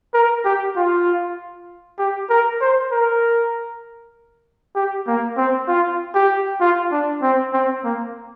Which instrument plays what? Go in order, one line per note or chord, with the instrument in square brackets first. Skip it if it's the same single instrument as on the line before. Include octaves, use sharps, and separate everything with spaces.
[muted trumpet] A#4
G4
F4
G4
A#4
C5
A#4
G4
A#3
C4
F4
G4
F4
D4
C4
C4
A#3